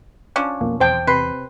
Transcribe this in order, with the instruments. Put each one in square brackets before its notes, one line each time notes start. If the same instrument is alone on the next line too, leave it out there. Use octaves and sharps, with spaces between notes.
[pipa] F3 C#4 D4
[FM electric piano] B1 F2 [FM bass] A#3
[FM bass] E2 [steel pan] C5 G5 A5
[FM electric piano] C3 [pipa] B4 [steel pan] C6